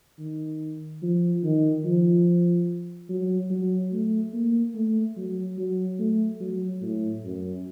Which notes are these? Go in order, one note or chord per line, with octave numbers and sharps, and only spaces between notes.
D#3
F3
D#3
F3
F#3
F#3
A3
A#3
A3
F#3
F#3
A3
F#3
A2
F#2